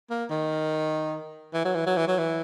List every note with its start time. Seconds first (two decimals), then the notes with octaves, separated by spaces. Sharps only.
0.10 A#3
0.30 D#3
1.53 E3
1.65 F#3
1.75 E3
1.86 F#3
1.97 E3
2.07 F#3
2.18 E3